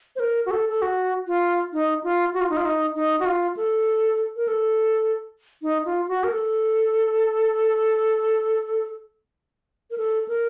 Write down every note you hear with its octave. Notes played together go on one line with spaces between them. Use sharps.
C5
A#4
F#4
A4
A4
F#4
F4
D#4
F4
F#4
F4
D#4
F4
D#4
D#4
F#4
F4
A4
A#4
A4
D#4
F4
F#4
A#4
A4
A#4
A4
A#4